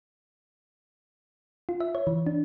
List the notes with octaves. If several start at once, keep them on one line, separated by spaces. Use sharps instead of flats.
F4
E5
C#5
E3
D4